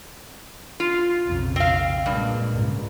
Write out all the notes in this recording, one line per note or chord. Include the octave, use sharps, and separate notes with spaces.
F4
B1 F2 C#3
C4 F5
G2 A#2 G#3 A#3
C#2 G#2 C#3